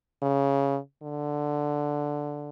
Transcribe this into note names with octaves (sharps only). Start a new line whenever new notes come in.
C#3
D3